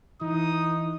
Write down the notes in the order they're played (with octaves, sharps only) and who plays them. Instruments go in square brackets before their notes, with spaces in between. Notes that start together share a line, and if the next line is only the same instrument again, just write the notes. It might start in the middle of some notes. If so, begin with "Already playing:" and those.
[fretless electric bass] E3 [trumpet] D#4 [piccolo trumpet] D#6